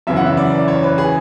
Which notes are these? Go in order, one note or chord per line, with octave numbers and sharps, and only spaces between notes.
F#2 C#3 E3 E5
F#5
E5
D5
C#5
B4
G#4